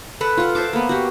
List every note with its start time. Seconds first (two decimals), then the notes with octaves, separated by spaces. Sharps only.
0.21 A4 B4 F#5
0.37 F4 F#5
0.55 C5 E5 A5 D6
0.73 A#3 B3
0.89 F#4 G4